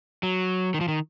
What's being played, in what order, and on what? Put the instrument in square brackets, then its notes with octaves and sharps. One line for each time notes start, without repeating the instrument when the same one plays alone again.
[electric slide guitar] F#3
D#3
F3
D#3